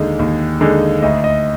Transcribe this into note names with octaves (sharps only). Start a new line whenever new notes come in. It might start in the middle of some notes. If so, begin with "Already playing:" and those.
Already playing: D#2 D3 G#3 D#4
D#2
D3 G#3 D#4
D2 D#5
D#5